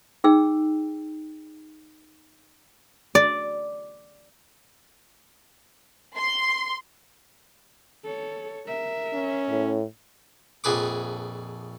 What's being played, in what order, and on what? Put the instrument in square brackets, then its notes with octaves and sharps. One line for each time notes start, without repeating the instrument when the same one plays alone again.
[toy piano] D#4 G#4 G5 E6
[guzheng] D5
[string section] C6
[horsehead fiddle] A4 C#5
A#4 E5
[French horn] C#4
[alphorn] A2
[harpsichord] A#1 F2 G#4 B4 D6